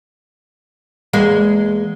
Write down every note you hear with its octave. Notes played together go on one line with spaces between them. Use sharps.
E2 G#3 A#3